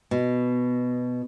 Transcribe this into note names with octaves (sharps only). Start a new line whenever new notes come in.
B2